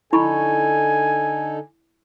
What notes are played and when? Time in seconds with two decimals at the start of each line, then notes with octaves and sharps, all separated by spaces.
0.13 D3 D#4 E4 A4 G#5 B5 C#6